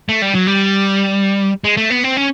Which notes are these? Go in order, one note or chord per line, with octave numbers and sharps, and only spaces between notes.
A3
G3
F#3
G3
G#3
A3
B3
C4
C#4